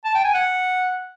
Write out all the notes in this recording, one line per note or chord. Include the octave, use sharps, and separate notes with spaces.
A5
G5
G#5
F#5